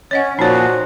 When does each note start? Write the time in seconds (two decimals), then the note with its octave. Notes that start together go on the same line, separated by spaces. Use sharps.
0.11 C#4 C#5 D#5 F#5
0.39 A#2 F3 D#4 F#4 C#5